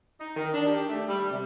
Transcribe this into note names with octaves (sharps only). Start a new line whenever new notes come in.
D#4
D#3
D4
G4
A3
G3
C3